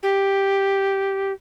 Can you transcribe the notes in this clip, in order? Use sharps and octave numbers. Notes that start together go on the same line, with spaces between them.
G4